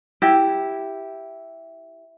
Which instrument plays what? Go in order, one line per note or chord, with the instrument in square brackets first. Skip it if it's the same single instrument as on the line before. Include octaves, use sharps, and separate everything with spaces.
[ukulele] E4 G4